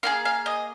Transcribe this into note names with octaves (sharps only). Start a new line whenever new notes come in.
A#3 F4 G#4 F5
F5
D#5